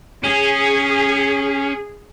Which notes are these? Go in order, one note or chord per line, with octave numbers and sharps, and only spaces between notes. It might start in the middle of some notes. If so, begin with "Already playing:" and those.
C#4 G#4